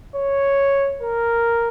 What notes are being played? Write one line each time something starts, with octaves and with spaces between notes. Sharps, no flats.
C#5
A#4